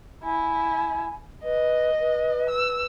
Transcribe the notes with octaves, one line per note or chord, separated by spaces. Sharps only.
E4 G#5
B4 D#5
B4
E6